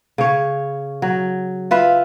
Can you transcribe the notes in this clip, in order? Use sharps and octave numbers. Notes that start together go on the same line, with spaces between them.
C#3 C#5
F#3
F4 B4 E5